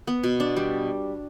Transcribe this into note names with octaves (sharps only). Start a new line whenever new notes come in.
B3
B2
D4
G3